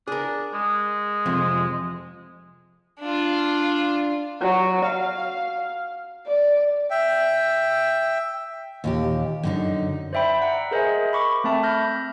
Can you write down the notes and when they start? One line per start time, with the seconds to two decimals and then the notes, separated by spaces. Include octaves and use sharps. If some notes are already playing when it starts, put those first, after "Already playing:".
0.08 D4 G#4 A#4
0.54 G#3
1.26 F2 C3 F3
3.00 D4 F4
4.41 F#3
4.85 F5
6.27 D5
6.91 E5 G5
8.84 D#2 A#2 G4
9.43 F#2 D3 D#4
10.13 C5 D5 E5 G5 B5
10.42 F#5 A#5
10.71 G#4 A#4 C5 D#5 E5 G#5
11.13 B5 C#6 D6
11.44 A3 C4 E5 A5
11.63 B5 C#6 F6 G6 A#6